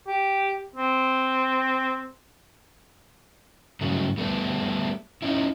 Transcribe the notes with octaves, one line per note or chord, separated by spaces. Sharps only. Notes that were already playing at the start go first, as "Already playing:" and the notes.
G4
C4
G2 C#3 F#3 A3
G3 A3 B3 D4
C#4 D#4 E4